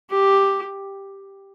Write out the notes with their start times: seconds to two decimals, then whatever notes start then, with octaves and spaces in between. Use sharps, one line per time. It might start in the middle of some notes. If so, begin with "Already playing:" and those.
0.10 G4